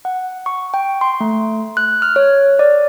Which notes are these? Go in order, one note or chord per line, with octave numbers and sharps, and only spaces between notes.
F#5
C#6
G5
C6
A3
F#6
F6
C#5
D5